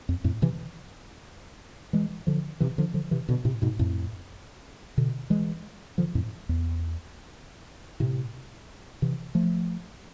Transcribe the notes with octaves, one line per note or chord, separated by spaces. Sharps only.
F2
F2 A2
C3 E3
E3 G#3
D3 F3
C3 E3
D3 F3
D3 F3
C3 E3
B2 D3
A2 C3
G#2 B2
F2 A2
B2 D3
E3 G#3
D3 F3
F2 A2
E2
A2 C3
C3 E3
F3 A3